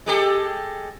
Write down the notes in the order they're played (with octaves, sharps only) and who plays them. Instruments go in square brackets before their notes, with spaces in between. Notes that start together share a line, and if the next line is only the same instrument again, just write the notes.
[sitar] G#3 G4 A4